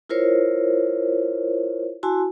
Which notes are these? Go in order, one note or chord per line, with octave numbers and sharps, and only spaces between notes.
E4 F4 A#4 C5 C#5
E4 F#4 G#5 A5 C6